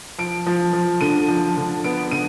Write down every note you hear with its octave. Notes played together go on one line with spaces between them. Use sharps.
F3 D7
F3
F3
D3 D#7
F3
D3
B3 D7
D3 D#7